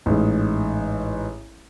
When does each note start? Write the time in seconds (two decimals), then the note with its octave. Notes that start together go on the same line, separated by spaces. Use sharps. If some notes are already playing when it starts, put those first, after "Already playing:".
0.06 A1 G#2 G#3